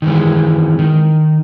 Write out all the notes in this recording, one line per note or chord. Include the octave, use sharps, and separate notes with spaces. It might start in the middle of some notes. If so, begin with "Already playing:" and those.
D#3 E3 G#3
D#3